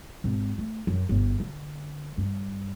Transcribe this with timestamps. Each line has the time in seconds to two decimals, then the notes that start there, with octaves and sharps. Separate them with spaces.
0.24 G#1
0.58 A3
0.87 F#2
1.09 G1
1.40 D3
2.18 G2